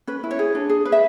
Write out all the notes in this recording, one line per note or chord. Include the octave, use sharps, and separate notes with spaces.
C#4 B4
E4
C#5
G#4
D4
G#4
B4
E5